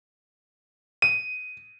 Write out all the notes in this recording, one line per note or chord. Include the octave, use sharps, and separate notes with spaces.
D#7